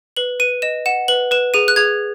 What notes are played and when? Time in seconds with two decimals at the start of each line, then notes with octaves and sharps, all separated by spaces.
0.16 B4 F#7
0.40 B4 D#7
0.62 D#5 E7
0.86 F#5 E7
1.08 B4 F#7
1.31 B4 E7
1.54 G#4 D#7
1.68 F#6
1.76 G#4 G#6